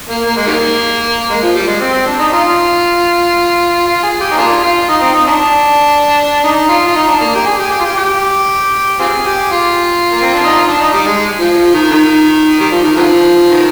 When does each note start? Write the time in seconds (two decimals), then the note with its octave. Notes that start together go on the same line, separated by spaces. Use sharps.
0.10 A#3
0.26 A#3
0.37 G#3
0.47 D#3 G3 A#3
1.30 G#3
1.43 F3
1.55 G3
1.68 G#3
1.81 C4
1.93 C4
2.07 D4
2.19 D#4
2.33 F4
3.87 F4
4.04 G#4
4.21 G4
4.31 D#4
4.38 A#3 D4 F4
4.64 F4
4.89 D#4
5.02 C4
5.14 D#4
5.27 D4
6.44 D#4
6.69 F4
6.86 F4
6.95 D#4
7.08 D4
7.21 A#3
7.35 G4
7.46 G#4
7.60 G4
7.71 G4
7.80 F4
7.84 G4
7.97 G4
9.00 C4 F4 G#4
9.26 G4
9.52 F4
10.12 A#3
10.22 C4
10.34 D4
10.44 D#4
10.55 F4
10.67 D4
10.80 D#4
10.94 G3
11.07 G#3
11.40 F3
11.57 F3
11.74 D#3
11.91 D#3
12.61 G3
12.72 F3
12.84 D#3
12.96 D3 F3
13.50 D#3